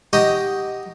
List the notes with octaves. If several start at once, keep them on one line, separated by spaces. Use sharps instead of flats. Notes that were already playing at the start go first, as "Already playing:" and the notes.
D#4 F#4 G4 D#5